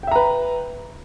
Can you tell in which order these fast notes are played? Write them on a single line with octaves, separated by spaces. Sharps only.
G5 E5 A#5 B4